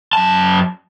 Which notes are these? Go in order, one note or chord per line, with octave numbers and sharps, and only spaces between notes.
F#2 A5